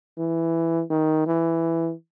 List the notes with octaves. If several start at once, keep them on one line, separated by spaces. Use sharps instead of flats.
E3
D#3
E3